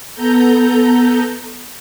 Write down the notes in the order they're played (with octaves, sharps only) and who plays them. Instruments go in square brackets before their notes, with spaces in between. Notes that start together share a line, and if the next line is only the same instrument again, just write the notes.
[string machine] B3 A4 A#5 G6